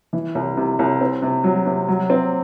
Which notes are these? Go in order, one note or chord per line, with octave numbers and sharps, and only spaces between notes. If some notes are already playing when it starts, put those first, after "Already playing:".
E3
C2
C3
C2
C4
C3
F#3
C3
F#3
C4